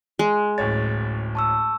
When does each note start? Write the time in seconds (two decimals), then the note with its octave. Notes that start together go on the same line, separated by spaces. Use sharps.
0.19 G#3
0.58 D1 A1 C#5 A6
1.35 A5 C#6 E6